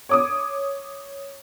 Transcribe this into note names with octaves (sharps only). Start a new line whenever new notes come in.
C#5 D6 D#6